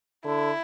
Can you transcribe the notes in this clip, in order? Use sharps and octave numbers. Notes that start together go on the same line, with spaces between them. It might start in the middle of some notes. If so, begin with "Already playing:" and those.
D3 E4